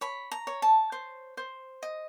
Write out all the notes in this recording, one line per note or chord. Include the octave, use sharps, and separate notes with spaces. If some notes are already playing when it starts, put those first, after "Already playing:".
C#5 B5
A#5
C#5
A5
C5
C5
D#5